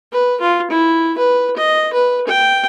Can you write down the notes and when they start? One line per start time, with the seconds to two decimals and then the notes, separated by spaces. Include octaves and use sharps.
0.12 B4
0.41 F4
0.71 E4
1.18 B4
1.57 D#5
1.93 B4
2.28 G5